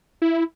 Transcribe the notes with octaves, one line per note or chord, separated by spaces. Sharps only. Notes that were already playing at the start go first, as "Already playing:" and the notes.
E4